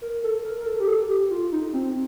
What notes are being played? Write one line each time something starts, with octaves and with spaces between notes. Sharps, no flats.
A#4
A4
A#4
A#4
A4
G4
A4
G4
F4
D#4
C4